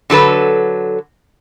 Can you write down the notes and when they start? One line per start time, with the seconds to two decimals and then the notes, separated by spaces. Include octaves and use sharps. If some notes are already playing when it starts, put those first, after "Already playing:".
0.10 D3 F#3 A4 B4